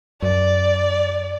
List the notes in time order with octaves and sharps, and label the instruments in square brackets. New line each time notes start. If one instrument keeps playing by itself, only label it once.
[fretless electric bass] F#2 [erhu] D5